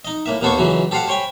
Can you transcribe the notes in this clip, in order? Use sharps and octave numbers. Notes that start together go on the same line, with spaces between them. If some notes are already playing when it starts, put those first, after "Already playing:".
D#4 D#5
A2 A#3 E5
D#2 A#3 B3 A4 C5 C#6
C#2 C#3 E3 F#3
G4 A4 C5 F5 F#5
C5 C#5 G5 G#5 B5